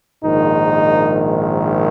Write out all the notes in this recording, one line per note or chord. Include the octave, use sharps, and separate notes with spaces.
A#1 G#2 D#3 D#4